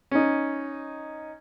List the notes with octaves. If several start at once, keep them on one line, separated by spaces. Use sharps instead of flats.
C#4 D#4